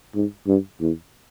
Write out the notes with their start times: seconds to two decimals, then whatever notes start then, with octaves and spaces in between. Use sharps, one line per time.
0.15 G#2
0.47 G2
0.80 E2